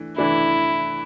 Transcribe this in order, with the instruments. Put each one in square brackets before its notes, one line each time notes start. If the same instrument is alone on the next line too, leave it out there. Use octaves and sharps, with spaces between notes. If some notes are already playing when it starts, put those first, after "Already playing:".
Already playing: [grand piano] E3 A3 D4
[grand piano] E3 A3 D4 [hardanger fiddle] E4